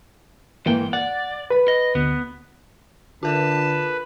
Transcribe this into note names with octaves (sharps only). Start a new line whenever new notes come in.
G#2 E3 A#3 G5
D5 F#5
B4 B5
D#5
D2 B3
D3 F4 A#4 B4 A5